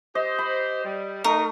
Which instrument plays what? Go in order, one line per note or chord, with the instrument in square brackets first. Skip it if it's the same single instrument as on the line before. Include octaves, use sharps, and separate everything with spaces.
[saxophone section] G4 C5 [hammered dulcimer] D#5
[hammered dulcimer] B5
[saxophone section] G3
[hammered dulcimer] A3 [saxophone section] D#4 [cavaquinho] A#4